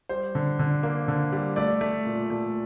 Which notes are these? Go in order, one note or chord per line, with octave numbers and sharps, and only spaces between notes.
G3 C5
D3
D3
A#3
D3
G3
A3 D5
A3
A#2
A3